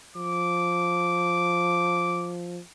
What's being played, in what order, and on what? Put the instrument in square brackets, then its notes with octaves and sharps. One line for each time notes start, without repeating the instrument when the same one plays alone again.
[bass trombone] F3 [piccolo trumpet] D6